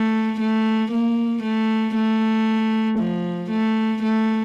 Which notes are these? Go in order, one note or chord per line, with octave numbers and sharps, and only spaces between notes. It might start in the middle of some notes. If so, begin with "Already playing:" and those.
Already playing: A3
A3
A#3
A3
A3
F3
A3
A3